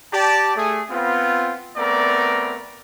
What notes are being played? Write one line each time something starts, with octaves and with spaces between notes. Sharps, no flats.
G4 D5 A5
A3 G#4
B3 C4 F4
A3 B3 C4 A#4 D5 A#5